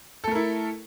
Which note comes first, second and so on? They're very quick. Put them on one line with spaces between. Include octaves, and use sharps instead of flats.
A4 A3 A#4 E4